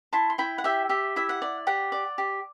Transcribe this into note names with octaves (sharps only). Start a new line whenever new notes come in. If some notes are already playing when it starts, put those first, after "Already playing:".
E4 A5 C6
C6
E4 G5 B5
F#5
G4 E5 G5
G4 E5
E4 E5
F#5
D5
G4 F#5
D5
G4